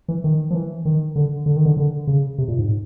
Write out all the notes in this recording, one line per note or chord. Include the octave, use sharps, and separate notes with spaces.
E3
D#3
F3
E3
D#3
D3
D3
D#3
D3
D3
C#3
C3
A#2
G#2